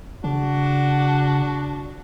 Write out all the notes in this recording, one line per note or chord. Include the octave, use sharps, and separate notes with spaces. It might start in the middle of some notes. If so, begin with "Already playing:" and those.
C#3 D4 F#4